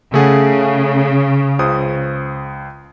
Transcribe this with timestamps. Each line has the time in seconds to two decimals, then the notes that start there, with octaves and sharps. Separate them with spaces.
0.14 C#3 A3 G#4 F#5
1.59 C#2 C5 D#6